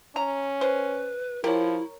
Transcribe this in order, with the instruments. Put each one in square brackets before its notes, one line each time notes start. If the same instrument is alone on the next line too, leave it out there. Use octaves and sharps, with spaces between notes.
[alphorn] C#4 [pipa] A#5
[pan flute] B4 [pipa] C5
[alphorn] F3 [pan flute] E4 [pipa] G4 [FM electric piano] A#4 C#5